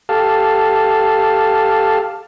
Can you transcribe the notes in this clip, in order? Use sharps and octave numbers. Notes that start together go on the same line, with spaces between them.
G4 A4 F5 A5